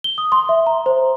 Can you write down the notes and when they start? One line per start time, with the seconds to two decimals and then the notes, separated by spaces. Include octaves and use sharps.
0.04 G7
0.18 D#6
0.32 C6
0.49 E5
0.67 A#5
0.86 C5